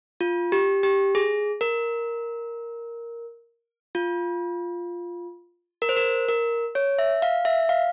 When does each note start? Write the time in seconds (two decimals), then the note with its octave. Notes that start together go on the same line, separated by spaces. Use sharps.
0.21 F4
0.52 G4
0.83 G4
1.15 G#4
1.61 A#4
3.95 F4
5.82 A#4
5.89 C5
5.96 A#4
6.29 A#4
6.75 C#5
6.98 E5
7.22 F5
7.45 E5
7.69 F5